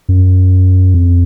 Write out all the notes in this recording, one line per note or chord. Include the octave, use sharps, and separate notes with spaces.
F#2
F2